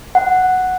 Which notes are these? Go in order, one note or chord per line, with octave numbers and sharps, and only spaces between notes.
F#5